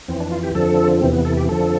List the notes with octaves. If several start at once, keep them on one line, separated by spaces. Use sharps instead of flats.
F2 E3 C4
D4
F4
G4
F2 D3 F3 A4
E2 C3 E3 C4
B3
A4
G4
F2 D3 F3 A4